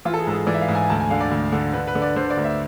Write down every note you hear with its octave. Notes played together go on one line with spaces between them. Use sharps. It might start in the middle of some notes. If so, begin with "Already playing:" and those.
E3 F4
A4
G#4
G#2 A4
G#4
E3 D5
E5
F5
G#2
G#5
D2 A5
G#5
D3 F5
D5
D2
D3
D3 B4
B4
D3
D5
D3 C5
D5
D2
E5